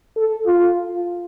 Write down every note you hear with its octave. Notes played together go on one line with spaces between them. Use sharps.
A4
F4